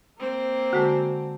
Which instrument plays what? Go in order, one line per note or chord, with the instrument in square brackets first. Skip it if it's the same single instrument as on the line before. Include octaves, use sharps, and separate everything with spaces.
[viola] A#3 C4
[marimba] D3 G#3 [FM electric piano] F#4 A4